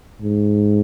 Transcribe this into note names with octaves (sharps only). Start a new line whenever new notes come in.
G#2